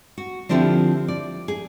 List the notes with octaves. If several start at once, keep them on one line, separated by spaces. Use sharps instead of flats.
F#4
D3 F3 C4 E4 F4 G4
D5
G#4